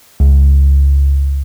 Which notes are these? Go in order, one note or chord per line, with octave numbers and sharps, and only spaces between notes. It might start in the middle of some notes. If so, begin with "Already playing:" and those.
C#2